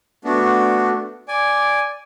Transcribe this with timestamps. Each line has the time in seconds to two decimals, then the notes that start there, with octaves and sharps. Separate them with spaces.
0.24 A3 B3 D4 F#4
1.28 D5 G#5